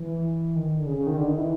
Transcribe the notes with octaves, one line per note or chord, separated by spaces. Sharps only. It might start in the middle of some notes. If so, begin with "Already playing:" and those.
Already playing: E3
D#3
D3
C#3
C#3
D#3
D3
D#3
E3